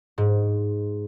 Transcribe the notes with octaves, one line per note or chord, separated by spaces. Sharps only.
G#2